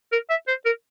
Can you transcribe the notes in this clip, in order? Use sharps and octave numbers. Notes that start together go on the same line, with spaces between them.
A#4
E5
C5
A#4